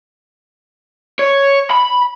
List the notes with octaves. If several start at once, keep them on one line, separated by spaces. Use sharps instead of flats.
C#5
B5